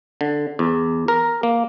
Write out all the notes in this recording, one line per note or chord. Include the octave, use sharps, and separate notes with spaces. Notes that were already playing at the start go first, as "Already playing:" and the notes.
D3
E2
A#4
A#3